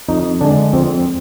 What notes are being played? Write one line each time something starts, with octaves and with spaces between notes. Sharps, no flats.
F2 D#4
D3 G#3 D4
F2 C4